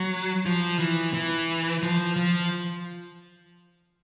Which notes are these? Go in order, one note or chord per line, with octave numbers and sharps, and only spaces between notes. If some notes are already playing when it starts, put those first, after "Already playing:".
Already playing: F#3
F3
E3
E3
F3
F3